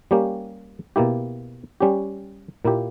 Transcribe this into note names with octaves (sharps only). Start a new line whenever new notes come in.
G3 A#3 C#4 G4
B2 A#3 E4 G4
G3 C#4 G4
A#2 A#3 E4 G4